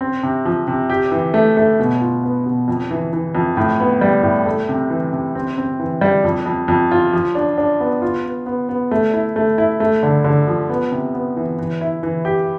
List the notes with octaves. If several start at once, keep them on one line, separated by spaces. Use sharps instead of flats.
C4
C3
F3
C3
G4
E3
A3
A3
B2
F4
B3
B2
F2
E3
E3
F2
A2
B3
G3
A2
A3
C3
E3
C3
C4
C4
E3
G3
F2
F2
F2
F4
F3
D4
D4
B3
F4
B3
B3
B3
A3
E4
A3
E4
A3
D3
D3
F3
B3
C3
B3
E3
E3
E4
E3
G4